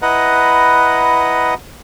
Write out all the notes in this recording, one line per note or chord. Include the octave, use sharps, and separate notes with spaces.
E4 B4 D#5 F#5 A#5